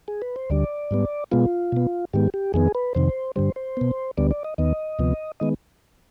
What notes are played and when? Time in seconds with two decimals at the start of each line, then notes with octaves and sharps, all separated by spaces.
0.08 G#4
0.22 B4
0.36 C5
0.50 D2 D3 G3 D5
0.91 G#2 G3 B3
1.31 B2 G#3 B3 F4
1.72 B2 B3
2.13 G#2 D#3 G#3 B3 G4
2.34 G4
2.54 F2 D#3 B3 G#4
2.75 B4
2.95 F2 C3 D#3 C5
3.36 G2 D3 G3 C5
3.56 C5
3.77 B2 B3
4.17 D2 D3 G3 B3 D5
4.31 D5
4.44 D#5
4.58 D#2 D#3 B3 D#5
4.99 D2 C3 F3 B3
5.40 D#3 G#3 B3 D#5